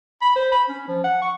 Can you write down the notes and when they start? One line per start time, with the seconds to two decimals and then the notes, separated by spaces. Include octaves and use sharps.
0.22 B5
0.36 C5
0.52 B5
0.69 C#4
0.88 F3
1.04 F#5
1.22 C#6